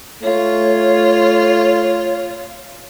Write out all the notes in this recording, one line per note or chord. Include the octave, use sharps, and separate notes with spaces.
A3 F4 C#5